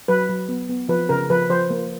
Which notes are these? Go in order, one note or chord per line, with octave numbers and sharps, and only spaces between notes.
F#3 B4
F#3
B3
B3
F3 B4
C#3 A#4
F3 B4
F3 C5
A#3